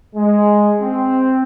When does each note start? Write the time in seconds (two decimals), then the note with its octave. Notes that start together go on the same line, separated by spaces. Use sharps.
0.16 G#3
0.81 C4